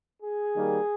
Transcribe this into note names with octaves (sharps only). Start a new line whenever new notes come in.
G#4
D#3 G3 A#3